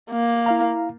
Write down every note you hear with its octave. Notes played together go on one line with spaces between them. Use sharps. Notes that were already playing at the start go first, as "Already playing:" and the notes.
A#3
E4 F5 A#5